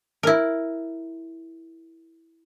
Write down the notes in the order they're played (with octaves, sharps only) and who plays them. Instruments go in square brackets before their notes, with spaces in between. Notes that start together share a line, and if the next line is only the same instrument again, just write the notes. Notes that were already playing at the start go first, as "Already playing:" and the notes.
[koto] E4 A#4